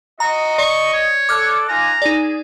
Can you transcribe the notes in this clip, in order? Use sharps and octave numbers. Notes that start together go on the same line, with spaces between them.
F#4 D#5 A#5
D5 C#6
C#5
A4 D5 D6 F6 F#6
D#4 F4 G#5 A#5
D#4 G#4 D5